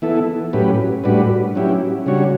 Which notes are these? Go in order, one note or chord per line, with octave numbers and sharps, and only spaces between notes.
E3 B3 E4 A4
A2 F#3 C#4 G4 B4
A2 G3 D4 F#4 B4
F#3 C#4 E4 G4
C#3 G3 D4 F#4 C#5